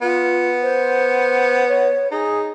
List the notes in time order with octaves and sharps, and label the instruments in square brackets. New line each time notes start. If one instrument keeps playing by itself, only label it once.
[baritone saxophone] B3 [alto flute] F4
[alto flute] C5
C#5
[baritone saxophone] D#4 [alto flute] G#4